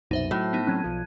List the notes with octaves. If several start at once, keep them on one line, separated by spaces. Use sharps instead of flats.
C2 F#2 B2 D#4 C5 E5
A2 F#3
B3 D#4
F#3 C4 C#4 F#6 G#6 D#7
B1 F3